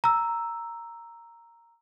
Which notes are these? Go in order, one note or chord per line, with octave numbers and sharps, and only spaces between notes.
A#5 E6